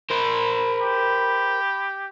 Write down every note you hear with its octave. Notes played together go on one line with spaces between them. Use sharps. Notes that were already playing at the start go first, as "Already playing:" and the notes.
A#4 C5 B5
G4